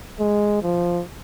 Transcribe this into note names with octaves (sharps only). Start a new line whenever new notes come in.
G#3
F3